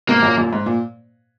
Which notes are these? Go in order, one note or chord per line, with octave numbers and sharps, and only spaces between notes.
G#2 B2 A#3
F#2 A#2
F#2 A#2
G#2
A#2